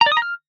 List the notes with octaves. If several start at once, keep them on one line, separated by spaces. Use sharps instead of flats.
A#5
D5
D#6
A#5
F6